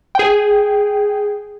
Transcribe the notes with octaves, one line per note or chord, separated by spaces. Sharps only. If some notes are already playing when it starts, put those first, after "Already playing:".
G#4 G5